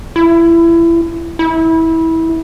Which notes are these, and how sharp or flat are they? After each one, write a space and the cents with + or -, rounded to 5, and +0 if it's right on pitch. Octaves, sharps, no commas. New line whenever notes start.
E4 +25
E4 -20